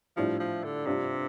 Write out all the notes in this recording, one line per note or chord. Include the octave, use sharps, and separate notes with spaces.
A2 F3 G3 D4 F4
F3
D3
G2 C3 G3 D4 F4